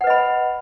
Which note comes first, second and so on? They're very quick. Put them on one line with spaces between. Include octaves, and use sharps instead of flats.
F#5 B4 D#5 B5